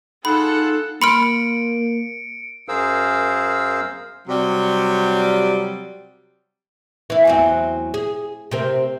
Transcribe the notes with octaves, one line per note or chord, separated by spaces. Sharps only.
D#4 F4 G#4 A4 F#5 B5
A#3 B5 C6 F6 C#7 D7
F#2 G#4 A#4 C5 F5 E6
C3 F#3 G3
E3 E4
E2 F#3 C4
G#4
C3 C4 A#4